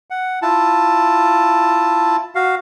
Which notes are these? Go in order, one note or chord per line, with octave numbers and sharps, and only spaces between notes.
F#5
E4 F4 A5
F#4 F5